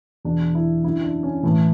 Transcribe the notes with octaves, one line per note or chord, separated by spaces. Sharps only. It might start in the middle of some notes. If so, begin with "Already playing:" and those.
E2 B2 D4
E4
F#2 D3 E4
D4
C#4
A2 E3 A3